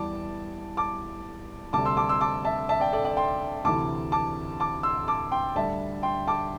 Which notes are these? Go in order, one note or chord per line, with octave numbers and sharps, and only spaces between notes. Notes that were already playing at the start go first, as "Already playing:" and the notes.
Already playing: E2 E3 G3 A5 D6
A5 D6
D2 C3 G3 A5 D6
C6 E6
A5 D6
C6 E6
A5 D6
E5 A5
E5 A5
D5 G5
A4 D5
D5 G5
G5 C6
D2 C3 E3 A5 D6
A5 D6
A5 D6
C6 E6
A5 D6
G5 C6
D2 D3 G3 E5 A5
G5 C6
A5 D6